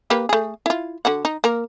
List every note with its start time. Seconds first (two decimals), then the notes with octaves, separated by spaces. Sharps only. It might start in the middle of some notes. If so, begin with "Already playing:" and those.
0.10 A#3 G4 B4
0.29 A3 G#4
0.66 E4 F4
1.05 D3 F#4 F#5
1.25 D#4
1.44 A#3 A#4